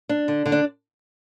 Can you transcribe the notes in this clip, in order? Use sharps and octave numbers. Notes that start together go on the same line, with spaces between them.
D4
D3
D3
D4